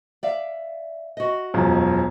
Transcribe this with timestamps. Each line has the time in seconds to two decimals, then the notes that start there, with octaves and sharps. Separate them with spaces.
0.23 D5 E5 F5
1.17 F#4 D#5
1.54 E1 F#2 F3